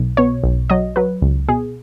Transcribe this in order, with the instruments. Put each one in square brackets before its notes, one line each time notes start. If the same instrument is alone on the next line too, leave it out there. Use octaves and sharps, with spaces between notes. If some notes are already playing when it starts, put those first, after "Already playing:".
Already playing: [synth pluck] B1
B2 C#5
B1
F#3 D#5
F#3 B4
C#2
B2 G#4